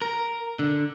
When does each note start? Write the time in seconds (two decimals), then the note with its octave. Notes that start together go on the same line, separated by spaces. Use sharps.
0.02 A#4
0.59 D3